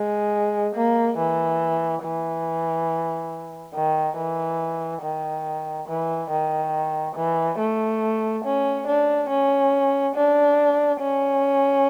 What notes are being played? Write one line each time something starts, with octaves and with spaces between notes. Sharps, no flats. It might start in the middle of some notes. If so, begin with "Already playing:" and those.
Already playing: G#3
A#3
E3
E3
D#3
E3
D#3
E3
D#3
E3
A3
C#4
D4
C#4
D4
C#4